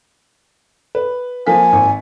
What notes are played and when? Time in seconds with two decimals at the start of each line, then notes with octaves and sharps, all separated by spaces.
0.95 B4
1.47 F3 A#3 G#5 B6
1.73 G#1